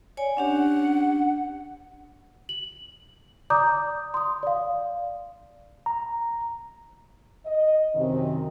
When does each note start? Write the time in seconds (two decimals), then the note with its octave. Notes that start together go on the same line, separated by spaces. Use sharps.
0.17 C#5 D5 G#5
0.37 C#4 D4 G4 F#5
2.49 F#7
3.50 D5 A#5 D6 D#6 G6
4.14 C6 D#6
4.43 D5 F5
5.86 A#5
7.46 D#5
7.95 F#2 C3 D#3